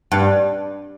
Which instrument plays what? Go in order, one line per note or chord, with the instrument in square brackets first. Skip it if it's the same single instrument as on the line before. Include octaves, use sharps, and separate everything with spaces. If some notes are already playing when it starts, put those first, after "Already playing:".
[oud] G2